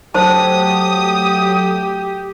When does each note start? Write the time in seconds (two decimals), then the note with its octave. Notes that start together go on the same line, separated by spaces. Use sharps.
0.15 F#3 A3 G4 C5 A5 D#6